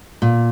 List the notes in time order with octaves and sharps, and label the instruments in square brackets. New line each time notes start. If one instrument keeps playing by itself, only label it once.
[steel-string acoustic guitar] A#2